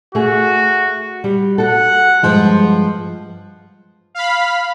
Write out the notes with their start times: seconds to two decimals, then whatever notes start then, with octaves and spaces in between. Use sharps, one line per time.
0.15 A3 F#4 G#4
1.24 G3
1.58 F#4 A4 F#5
2.23 G2 F3 G#3
4.15 F5 B5